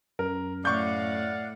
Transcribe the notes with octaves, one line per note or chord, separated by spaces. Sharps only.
F#2 A#4
A2 D5 F5 F#5 C#6 G6